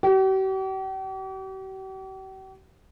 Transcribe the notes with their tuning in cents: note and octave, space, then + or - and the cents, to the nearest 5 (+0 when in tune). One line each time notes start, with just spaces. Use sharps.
G4 -45